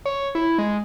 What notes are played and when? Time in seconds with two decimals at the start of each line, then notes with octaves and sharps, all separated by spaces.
0.05 C#5
0.35 E4
0.58 G#3